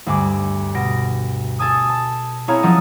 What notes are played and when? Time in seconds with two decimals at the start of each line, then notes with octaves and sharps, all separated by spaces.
0.06 D2 G2 G#5 D6
0.74 B2 A#6 D7
1.59 A4 G#5 D#6
1.89 A5
2.48 C4 E4 G#4 C#5 F5 A#5
2.63 F3 F#3 C4 C#4 A4 D#5